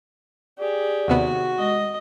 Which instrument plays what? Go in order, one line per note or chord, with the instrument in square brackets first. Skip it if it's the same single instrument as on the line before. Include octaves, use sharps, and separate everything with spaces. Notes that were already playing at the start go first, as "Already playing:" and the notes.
[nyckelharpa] G4 G#4 [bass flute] D5
[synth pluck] D#2 C3 B3 [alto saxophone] F#4
[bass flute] G#3 [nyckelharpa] D#5